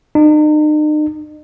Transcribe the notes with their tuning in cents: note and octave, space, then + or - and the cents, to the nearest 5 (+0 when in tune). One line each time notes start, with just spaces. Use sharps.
D#4 -40